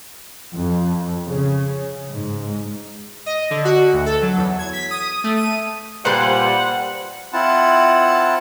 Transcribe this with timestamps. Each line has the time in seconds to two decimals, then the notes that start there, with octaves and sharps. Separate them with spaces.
0.53 F2
1.25 C#3
2.10 G#2
3.26 D#5
3.51 D3
3.65 F#4
3.93 D2
4.06 A4
4.22 F#3
4.37 E2
4.59 G#6
4.73 B6
4.91 D#6
5.24 A3
5.36 D#7
6.05 A#2 G3 B4 C5 F#5
7.33 C4 E4 F4 F#5 A5